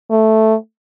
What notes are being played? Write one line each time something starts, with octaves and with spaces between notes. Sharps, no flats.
A3